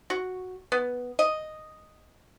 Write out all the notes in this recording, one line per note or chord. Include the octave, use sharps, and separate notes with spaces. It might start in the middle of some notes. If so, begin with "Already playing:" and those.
F#4
B3
D#5